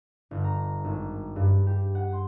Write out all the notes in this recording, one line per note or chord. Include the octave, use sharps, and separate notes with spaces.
G1
A#5
G#1
G2
G4
F#5
C6